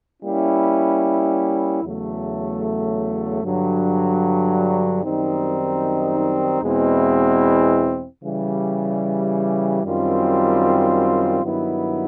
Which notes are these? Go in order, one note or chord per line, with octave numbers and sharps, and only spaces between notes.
G3 A#3 C#4 E4
E2 C#3 F#3 A3
G2 D3 F#3
F#2 D#3 G3 C4 D#4
E2 B2 G#3 C4 E4
C#3 E3 G3
F#2 D#3 G3 C4 F4
G2 D#3 F#3 B3 E4